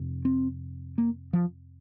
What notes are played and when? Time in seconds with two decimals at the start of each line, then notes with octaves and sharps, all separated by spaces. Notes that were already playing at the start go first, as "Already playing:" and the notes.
Already playing: F2 C3
0.25 C4
0.98 A#3
1.33 F3